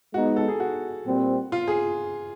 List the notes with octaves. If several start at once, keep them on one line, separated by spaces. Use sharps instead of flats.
G#3 B3 D#4 F#4
A4
G#4
F#4
A#2 G3 C4
F4
G#4